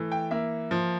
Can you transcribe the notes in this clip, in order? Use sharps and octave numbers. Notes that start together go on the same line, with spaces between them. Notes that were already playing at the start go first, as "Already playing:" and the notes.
Already playing: E3 A3
G5
A#3 E5
F3